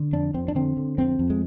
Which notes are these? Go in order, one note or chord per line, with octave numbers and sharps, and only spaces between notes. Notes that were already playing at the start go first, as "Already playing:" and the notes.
Already playing: D3
F2 D4
F2 C4
D4
D3 C4
D3
F2 C4
F2
G#3